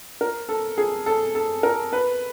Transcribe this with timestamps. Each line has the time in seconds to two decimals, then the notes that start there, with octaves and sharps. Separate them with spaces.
0.21 A#4
0.49 A4
0.78 G#4
1.06 A4
1.35 A4
1.63 A#4
1.93 B4